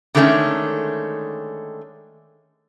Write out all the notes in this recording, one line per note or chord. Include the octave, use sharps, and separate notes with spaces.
D3 D#3 G#3 A3 B3 C#4